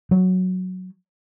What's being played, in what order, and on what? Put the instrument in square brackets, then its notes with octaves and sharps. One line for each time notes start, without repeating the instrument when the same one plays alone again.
[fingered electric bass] F#3